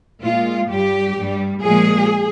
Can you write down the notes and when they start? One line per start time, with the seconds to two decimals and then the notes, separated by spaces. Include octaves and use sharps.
0.21 A#2 G#3 F4
0.68 G2 G3 G4
1.16 G2 G3
1.61 A#2 F3 G#3 G#4